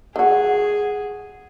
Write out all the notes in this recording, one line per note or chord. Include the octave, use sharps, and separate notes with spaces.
D#3 F#4 G#4